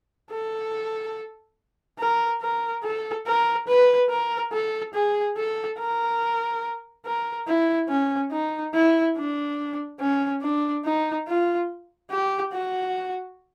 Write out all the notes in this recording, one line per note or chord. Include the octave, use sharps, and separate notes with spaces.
A4
A#4
A#4
A4
A#4
B4
A#4
A4
G#4
A4
A#4
A#4
E4
C#4
D#4
E4
D4
C#4
D4
D#4
F4
G4
F#4